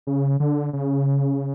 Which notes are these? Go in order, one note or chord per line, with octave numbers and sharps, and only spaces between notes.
C#3
D3
C#3